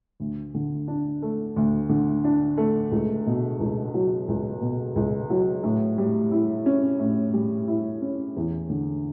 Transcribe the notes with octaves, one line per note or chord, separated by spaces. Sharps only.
D2
D3
D4
A3
D2
D3
D4
A3
C#2
B2
C#2
F#3
C#2
B2
C#2
F#3
A2
G3
E4
C#4
A2
G3
E4
C#4
E2
D3